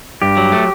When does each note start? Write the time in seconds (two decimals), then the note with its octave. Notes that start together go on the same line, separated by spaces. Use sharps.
0.22 G2 G4
0.37 F#3
0.52 A3